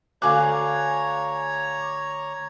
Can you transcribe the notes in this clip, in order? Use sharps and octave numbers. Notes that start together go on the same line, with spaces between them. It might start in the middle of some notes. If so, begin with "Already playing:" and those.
D2 C#5 F5 G#5 A#5 D6 F#6